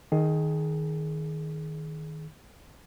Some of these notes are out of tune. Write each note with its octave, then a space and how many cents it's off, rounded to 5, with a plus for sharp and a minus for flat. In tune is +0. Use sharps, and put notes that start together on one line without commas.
D#3 +0 G#4 +20